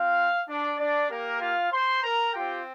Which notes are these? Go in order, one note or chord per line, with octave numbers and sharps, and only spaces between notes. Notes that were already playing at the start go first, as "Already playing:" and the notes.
Already playing: C4 F4 F5
D4 D5
D4 D5
A#3 G4 A#4
F4 F5
C5 C6
A#4 A#5
C4 F4 G4 G5